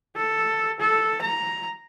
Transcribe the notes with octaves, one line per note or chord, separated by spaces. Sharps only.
A4
A4
A#5